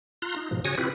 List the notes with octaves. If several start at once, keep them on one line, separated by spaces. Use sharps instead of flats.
F4 A#5 C6 F#6
D#4
G#2 B2 F3
C#3 F#4 C#5 G#5 D#6 A#6
C4 E4 F4 G4 B4